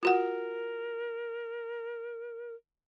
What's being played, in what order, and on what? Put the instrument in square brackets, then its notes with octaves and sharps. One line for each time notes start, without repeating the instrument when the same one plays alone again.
[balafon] F4 F#4 F#5 [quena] A#4